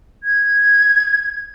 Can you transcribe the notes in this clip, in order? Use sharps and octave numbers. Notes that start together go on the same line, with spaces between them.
G#6